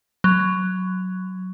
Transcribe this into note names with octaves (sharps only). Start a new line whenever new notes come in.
F#3